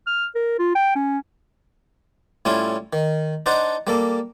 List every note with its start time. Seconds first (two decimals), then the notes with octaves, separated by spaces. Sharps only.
0.07 F6
0.35 A#4
0.58 F4
0.75 G5
0.95 C#4
2.45 A2 G3 C#4 E4 F4
2.93 D#3
3.46 D4 D#4 C5 F#5 A5
3.87 G3 A#3 A4